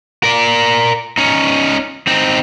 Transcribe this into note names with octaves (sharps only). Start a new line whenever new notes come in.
A#4 D5
C#4 D#4
C4 D#4